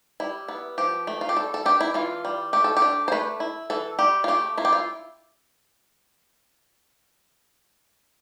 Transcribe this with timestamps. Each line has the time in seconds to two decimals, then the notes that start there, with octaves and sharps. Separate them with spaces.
0.20 G3 E4
0.48 B3
0.78 F3 G4
1.07 A3
1.21 F4
1.29 G4
1.36 G3 A4
1.54 A4
1.65 D4 G4
1.81 E4
1.94 E3 F4
2.25 G3
2.53 A3 G4
2.64 A4
2.77 G4
2.82 D4
3.08 C5
3.12 A3 B4
3.40 E4
3.70 E3 A4
3.99 G3 G4
4.24 F4
4.28 A3 G4
4.57 E4 F4
4.65 G4
4.73 F4